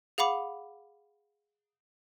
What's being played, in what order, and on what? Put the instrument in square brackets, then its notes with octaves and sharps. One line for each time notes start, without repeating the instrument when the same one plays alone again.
[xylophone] G#4 F5 F#5 B5 D6